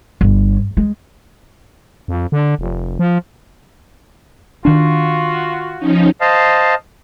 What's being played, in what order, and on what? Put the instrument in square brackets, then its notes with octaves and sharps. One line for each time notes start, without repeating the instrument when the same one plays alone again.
[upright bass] G1
G#3
[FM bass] F2
D3
F1
F3
[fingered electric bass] D#3 D4 [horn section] F4 F#4
[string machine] F3 C#4 D#4
[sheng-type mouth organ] C5 D#5 F5 A5